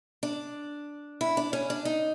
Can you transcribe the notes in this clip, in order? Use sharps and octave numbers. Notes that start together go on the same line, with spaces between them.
D4
E4
D4
C#4
D4
D#4